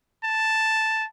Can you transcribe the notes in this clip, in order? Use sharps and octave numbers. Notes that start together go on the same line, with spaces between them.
A5